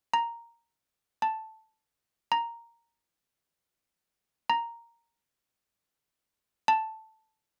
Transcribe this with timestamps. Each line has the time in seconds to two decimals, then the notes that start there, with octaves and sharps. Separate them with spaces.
0.14 A#5
1.22 A5
2.32 A#5
4.50 A#5
6.68 A5